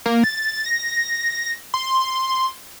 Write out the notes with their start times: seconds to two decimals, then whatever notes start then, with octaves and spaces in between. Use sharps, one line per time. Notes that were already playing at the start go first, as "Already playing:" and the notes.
0.06 A#3
0.24 A6
0.66 A#6
1.74 C6